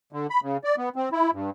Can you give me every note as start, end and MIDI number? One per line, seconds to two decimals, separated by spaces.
0.12 0.27 50
0.30 0.41 83
0.43 0.57 49
0.64 0.76 74
0.77 0.89 59
0.96 1.09 60
1.12 1.31 64
1.33 1.50 43